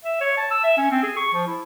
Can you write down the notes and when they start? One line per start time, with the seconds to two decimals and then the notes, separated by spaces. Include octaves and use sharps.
0.04 E5
0.20 C#5
0.37 A5
0.50 E6
0.63 E5
0.77 C#4
0.91 C4
1.03 G#4
1.16 C#6
1.34 F3
1.46 E4